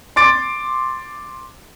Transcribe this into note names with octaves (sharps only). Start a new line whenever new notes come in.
C6 D6 A6 D7